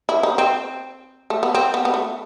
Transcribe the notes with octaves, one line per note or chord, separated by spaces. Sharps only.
E4
D#4
C4
A3
B3
C4
B3
B3
A3